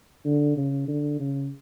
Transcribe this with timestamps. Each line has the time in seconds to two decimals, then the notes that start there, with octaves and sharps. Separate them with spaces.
0.25 D3
0.57 C#3
0.88 D3
1.19 C#3